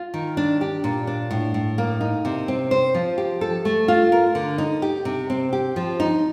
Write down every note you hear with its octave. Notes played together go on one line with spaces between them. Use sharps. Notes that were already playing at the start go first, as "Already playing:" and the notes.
Already playing: F4
D#3
D4
G4
A#2
D4
A2
A2
A#3
D#4
C3
C4
C5
F3
G4
A4
A3
F4
A#4
D3
D#4
G4
C3
C4
G4
F3
D#4